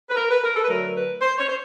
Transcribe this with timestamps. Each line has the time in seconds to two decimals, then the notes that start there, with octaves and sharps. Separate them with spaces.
0.10 B4
0.16 A#4
0.30 B4
0.43 A#4
0.56 A4
0.64 B4
0.68 D3 F#3 A3 A#4
0.95 B4
1.21 C5
1.38 C#5
1.49 C5